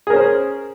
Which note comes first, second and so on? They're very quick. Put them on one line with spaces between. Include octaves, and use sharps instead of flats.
G#4 A#4 C#4 C5